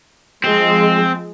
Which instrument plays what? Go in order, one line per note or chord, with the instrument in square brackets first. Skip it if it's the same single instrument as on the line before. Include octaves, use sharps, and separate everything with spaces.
[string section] F3 G#3 [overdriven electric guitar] C4